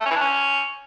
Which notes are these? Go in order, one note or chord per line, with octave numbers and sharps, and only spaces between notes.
A3
C#4
E3
D4
C#4